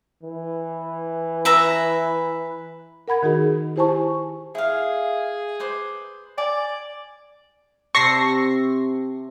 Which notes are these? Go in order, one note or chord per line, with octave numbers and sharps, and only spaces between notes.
E3
B4 E5 A#5
A#4 F#5 B5 G#6
D#3 D#4 F#4 G#4
E4 G4 C5 G#5 A5 C#6
E4 G#4 F5
B4 C5 D6
D5 G#5
C3 C4 A5 C#6 A#6 C7